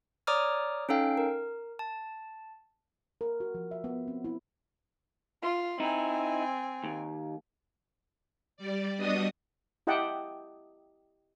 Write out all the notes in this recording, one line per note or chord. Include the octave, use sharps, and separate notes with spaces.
C#5 D5 A#5 D6 D#6 F6
C#4 D#4 A4 F5 G5
A#4
A5
A#4
F#4
F3
E5
B3
C4
E4
F4 C6
C4 D#4 E4 G#5
D#2
G3 D5
G3 B3 D4 F#4 D#5 D#6
E4 G4 D#5 F#5 G5 A5